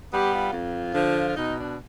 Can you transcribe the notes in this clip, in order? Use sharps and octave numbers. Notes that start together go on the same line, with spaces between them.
G3 B3 G4
F4
F2
D3 F3
F4
B2 D#4
D4